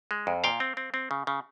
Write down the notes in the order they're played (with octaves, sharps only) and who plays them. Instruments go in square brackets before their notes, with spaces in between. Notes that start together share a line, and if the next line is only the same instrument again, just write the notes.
[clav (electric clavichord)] G#3
F2
A#2 F5 G5
C4
C4
C4
C#3
C#3